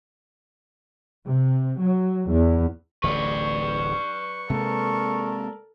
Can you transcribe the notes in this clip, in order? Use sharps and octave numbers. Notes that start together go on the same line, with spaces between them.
C3
F#3
E2
D1 A1 D3 B4 D5 C#6
C3 G#3 A#3 A4 A#4